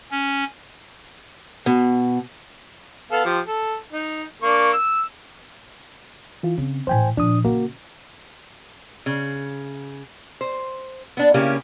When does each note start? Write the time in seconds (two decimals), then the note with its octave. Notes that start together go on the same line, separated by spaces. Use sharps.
0.11 C#4
1.66 B2
3.11 B3 A4 F5
3.25 F3 G4
3.48 A4
3.93 D#4
4.42 A#3 D4 C#6
4.73 E6
6.43 E3 F4
6.58 C#3 C4
6.87 A2 E3 C5 G5 G#5
7.17 A#2 F3 D4 D#6
7.45 C#3 A#3 F#4
9.06 C#3
10.41 C5
11.17 B3 D4
11.34 C#3 A#3 C#4 E4 G4